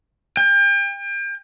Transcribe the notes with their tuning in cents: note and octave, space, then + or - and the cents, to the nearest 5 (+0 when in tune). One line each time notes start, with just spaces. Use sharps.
G5 +35